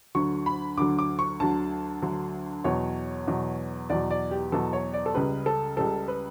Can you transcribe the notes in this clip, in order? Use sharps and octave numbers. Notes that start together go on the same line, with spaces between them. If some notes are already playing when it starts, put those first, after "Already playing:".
D2 D3 F#3 C#6
B5
D2 D3 F#3 D6
D6
C#6
D2 D3 F#3 A5
D2 D3 F#3
E2 B2 F#3 C#5
E2 B2 F#3
E2 B2 F#3 D5
D5
G4
E2 B2 F#3 A4
C#5
D5
A4
C#2 C#3 G3 B4
A4
C#2 C#3 G3 A4
B4